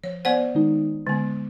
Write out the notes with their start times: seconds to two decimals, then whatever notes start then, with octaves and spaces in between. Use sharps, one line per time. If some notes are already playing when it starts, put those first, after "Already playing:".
0.04 F3 C#5
0.25 B3 C5 D5 F#5
0.55 D#3 G#3 D#4
1.07 D3 G#3 B3